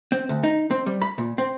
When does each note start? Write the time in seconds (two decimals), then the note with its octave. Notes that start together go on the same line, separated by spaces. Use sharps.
0.12 C4
0.29 D2
0.43 D#4
0.71 C4
0.86 G3
1.02 B5
1.18 A#2
1.38 C4